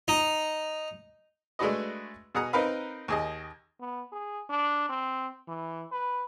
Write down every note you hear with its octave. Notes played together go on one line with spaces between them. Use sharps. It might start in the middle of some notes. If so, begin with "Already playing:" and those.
D#4
G#3 A3 D4 F#4 B4 D#5
B2 G#4 F#5 A#5 D#6
C4 D#4 A#4 B4 F5 B5
D#2 G#4 D#5
B3
G#4
D4
C4
E3
B4